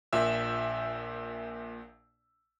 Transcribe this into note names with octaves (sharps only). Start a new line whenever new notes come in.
A#1 A#2 E5 E6